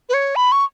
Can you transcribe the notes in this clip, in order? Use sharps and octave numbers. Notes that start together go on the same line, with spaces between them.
B4
C#5
B5
C#6